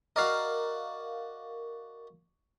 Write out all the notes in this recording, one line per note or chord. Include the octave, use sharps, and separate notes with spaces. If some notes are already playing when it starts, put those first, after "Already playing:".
F#4 A#4 D5 D#5 F5